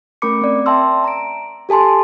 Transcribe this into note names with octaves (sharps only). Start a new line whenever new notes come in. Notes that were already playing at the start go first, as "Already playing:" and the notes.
A3 C#4 A#4 B5 D6 C#7
C4 D5
E5 G5 A5 C6 E6
A#5 D7
G4 A4 G#5 A5 C6